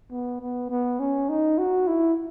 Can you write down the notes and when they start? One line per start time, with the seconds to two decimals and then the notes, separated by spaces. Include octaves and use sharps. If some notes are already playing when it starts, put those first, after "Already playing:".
0.11 B3
0.41 B3
0.70 B3
1.00 C#4
1.29 D#4
1.58 F#4
1.87 E4